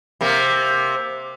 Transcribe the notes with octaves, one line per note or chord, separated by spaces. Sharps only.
C3 A#3